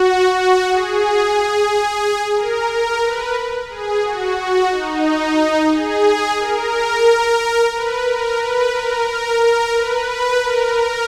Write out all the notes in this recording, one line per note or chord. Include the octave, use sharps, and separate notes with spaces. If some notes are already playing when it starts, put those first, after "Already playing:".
Already playing: F#4
F#4
G#4
A#4
A#4
B4
G#4
F#4
F#4
D#4
G#4
A#4
B4
A#4
B4
A#4
A#4
A#4
B4
B4
A#4
A#4